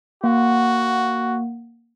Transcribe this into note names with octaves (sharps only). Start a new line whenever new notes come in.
A#3 F#4 F#5